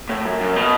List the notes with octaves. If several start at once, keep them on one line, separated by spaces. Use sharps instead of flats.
A2
F#2
F#2
B2